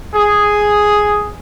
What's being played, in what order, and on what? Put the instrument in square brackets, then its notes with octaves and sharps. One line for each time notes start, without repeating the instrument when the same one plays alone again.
[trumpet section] G#4